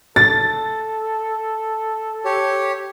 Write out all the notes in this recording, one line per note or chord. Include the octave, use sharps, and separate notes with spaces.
A4 A6
G4 C#5